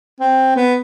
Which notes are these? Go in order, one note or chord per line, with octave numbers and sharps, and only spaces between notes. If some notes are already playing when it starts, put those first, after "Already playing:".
C4
B3